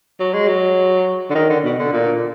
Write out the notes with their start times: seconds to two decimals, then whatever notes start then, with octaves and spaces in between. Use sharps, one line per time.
0.20 F#3
0.33 G#3
0.47 F#3
1.30 D3
1.35 D#3
1.49 D3
1.64 B2
1.79 D3
1.93 A#2